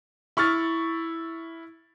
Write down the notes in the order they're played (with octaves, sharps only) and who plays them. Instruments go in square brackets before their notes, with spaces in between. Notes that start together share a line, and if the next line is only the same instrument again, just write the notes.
[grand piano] E4 C#6 F6 A6